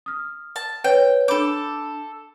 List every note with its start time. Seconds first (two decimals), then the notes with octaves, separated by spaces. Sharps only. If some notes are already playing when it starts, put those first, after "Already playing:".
0.06 D#6 F6
0.56 A5
0.84 B4 C#5 G5
1.28 D4 A4 B5 D6 G6